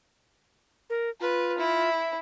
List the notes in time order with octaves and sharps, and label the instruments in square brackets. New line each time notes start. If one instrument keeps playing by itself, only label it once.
[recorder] A#4
[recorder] F4 [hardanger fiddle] B4
[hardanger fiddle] E4